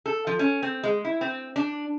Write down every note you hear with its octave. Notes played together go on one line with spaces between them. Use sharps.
A4
F3
C#4
C4
G#3
E4
C4
D4